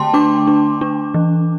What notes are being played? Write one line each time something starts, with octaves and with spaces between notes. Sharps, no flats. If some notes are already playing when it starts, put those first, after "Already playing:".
Already playing: D3 A3 G5 A5 C6
D4 D6
D4
D4
E3